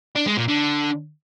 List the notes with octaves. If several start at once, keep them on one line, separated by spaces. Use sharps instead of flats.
D4
G#3
A#2
D3